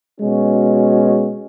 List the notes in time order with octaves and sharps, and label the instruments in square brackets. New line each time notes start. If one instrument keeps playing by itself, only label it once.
[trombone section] B2 G#3 C#4 F#4